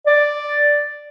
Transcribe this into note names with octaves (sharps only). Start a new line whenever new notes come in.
D5